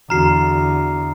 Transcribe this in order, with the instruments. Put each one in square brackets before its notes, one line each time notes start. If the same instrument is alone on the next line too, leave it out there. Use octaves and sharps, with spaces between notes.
[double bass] E2 D3 [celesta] F#4 F6 [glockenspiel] A#5 C7